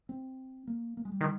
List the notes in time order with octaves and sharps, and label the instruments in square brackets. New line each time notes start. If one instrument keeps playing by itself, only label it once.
[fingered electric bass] C4
A#3
A#3
G#3
G3
[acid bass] D#3